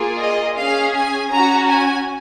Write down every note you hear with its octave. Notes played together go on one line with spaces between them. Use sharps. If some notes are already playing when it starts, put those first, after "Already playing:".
Already playing: A#3 F4 G#4
D#5
C#4 G#4 F5
G#5
C#4 F#4 A#5
G#5